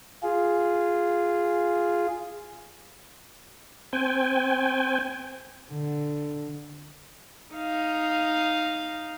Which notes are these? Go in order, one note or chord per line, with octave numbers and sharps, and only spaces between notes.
F4 G#4
C4 G5 G#5
D3
D#4 F5